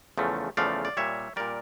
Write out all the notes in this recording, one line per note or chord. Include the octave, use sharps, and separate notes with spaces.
E2 C#3 F3 A3
E2 C#3 F3 A3 D5 F5
D5
A#2 G3 C#5 E5
A#2 G3 A#4 D5